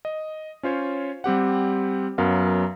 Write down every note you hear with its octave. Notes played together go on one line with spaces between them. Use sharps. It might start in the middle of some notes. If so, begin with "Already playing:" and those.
D#5
C#4 F4 C5 C#5
G3 C4 G4 F#5
F#2 F#3 B3 A#4 F5